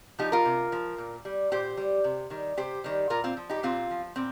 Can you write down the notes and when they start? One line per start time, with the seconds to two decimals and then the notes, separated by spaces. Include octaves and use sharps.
0.19 F3 D#4 G4
0.32 F4 A#4
0.45 C3
0.72 F3
0.98 A#2
1.25 G3
1.52 A#2 G4 C5
1.77 G3
2.04 C3
2.30 D#3 G3
2.57 C3 G4 C5
2.84 D#3 G3
3.10 A#2 F4 A#4
3.24 C4 F4
3.37 F3
3.50 D#4 G4
3.63 A#2 C4 F4
3.90 F3
4.16 A#2 C4